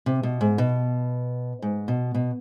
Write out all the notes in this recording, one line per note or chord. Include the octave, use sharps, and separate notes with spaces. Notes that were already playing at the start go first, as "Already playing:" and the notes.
C3
B2
G#2
B2
G#2
B2
B2